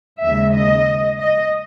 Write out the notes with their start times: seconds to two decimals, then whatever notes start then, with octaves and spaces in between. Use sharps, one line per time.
0.23 D#2 C#3 G#3 E5
0.56 D#5
1.19 D#5